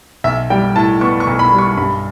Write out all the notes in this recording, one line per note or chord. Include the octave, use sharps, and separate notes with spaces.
B1 E5
G3 G5
A2 A5
B3 C#6
C#6
B1
B5
G3
C#6
G2 B5